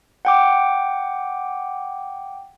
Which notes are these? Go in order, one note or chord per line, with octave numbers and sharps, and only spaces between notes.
F#5 G5 D6